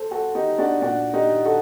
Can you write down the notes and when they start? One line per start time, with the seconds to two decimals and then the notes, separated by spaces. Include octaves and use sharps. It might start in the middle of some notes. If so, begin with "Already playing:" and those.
Already playing: A4 C5
0.11 F#4 A4
0.35 D#4 G4
0.58 D4 F#4
0.82 A#2 D4 F#4
1.14 D#4 G4
1.45 F#4 A4